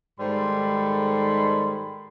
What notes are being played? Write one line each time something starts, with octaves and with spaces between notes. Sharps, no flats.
G#2 D#3 G3 A4 B5 C6